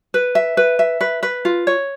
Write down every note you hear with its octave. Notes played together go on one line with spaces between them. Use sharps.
B4
E5
B4
E5
B4
B4
F4
C#5